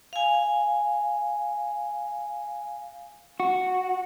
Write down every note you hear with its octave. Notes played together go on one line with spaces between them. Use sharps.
F5 G#5
F#4